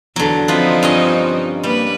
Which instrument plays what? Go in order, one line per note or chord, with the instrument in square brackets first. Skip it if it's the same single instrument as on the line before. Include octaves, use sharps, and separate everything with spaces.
[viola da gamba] E2 [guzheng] D3 F#3
[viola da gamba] F3 C4 D#4 [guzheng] B3 F4 B4
[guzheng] G2 C#4 D#5
[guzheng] G3 [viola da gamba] A#3 B4